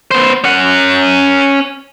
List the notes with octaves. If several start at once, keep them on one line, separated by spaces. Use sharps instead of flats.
B3 C5
C#4 F#5